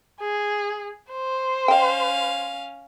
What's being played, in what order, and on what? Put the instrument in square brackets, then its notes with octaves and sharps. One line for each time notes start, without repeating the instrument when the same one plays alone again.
[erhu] G#4
C5
[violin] C#4 F5 [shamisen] D#5 G5